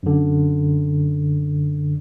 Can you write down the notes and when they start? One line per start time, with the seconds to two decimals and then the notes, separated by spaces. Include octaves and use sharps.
0.03 F#2 D3